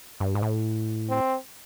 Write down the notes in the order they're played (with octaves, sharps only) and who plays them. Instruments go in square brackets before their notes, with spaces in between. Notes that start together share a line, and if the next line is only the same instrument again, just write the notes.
[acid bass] G2
G#2
A2
[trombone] C4